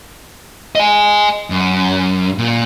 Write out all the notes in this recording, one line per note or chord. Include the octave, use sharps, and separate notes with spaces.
D#5 G#5
F#2
A#2